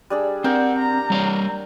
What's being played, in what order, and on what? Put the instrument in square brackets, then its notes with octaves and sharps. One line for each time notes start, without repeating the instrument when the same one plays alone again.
[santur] G3 D4 G#4
[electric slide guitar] C4 [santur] D4 A#4 G5 [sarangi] F#5
[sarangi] A#5
[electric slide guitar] G3 C#5 D5